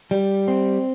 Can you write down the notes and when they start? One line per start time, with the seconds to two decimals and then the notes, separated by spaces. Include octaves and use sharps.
0.11 G3
0.48 C4